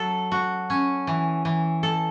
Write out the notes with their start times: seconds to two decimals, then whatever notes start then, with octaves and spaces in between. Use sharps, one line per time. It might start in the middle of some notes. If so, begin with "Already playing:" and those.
Already playing: F#3 A4
0.32 F#4
0.70 C#4
1.07 E3
1.45 E3
1.83 A4